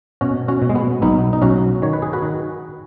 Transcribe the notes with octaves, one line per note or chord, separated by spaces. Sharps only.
B2 C#4 F#4
C#4 F#4
B2
G#3
B3
B1 B3 D#4
D#4
B1 C#4 F#4
D#3 C#5
B4
G#4
F#4 B4
D#3